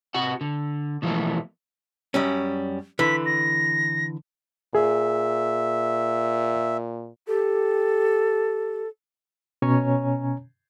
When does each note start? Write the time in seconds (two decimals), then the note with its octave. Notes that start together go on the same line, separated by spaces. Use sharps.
0.14 C3 F#4 F#5
0.41 D3
1.02 B2 E3 F3 A3 A#3
2.14 F#2 G3 C#4
2.99 D3 E3 B6
3.26 A#6
4.75 A#2 G#4 E5
7.28 G4 A4
9.62 B2 C#4 C#5 G#5 A#5